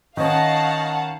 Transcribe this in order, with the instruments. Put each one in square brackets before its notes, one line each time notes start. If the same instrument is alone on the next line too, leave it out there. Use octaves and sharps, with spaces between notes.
[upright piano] D#3 C#4 [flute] D#5 [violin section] F5 F#5 A5